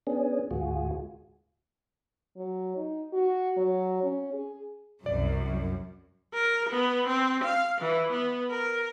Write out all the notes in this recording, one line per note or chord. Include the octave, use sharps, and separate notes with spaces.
B3 C#4 D4 G#4
D2 G#2 F4 F#4 G#4
F#3
D#4
F#4
F#3
C#4
G#4
C2 F#2 D5
A#4
B3
C4
F5
E3
B3
A#4